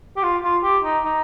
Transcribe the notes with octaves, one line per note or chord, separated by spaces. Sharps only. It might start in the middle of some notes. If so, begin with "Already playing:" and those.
G4
F4
F4
G4
D#4
D#4